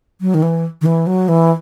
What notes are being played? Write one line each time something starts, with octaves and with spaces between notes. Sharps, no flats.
F#3
D#3
E3
D#3
E3
F#3
E3